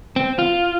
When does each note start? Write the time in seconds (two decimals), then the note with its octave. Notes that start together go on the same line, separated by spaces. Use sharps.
0.16 C4
0.39 F4